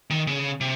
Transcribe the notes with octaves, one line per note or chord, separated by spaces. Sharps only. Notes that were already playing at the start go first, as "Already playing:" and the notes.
D#3
C#3
C3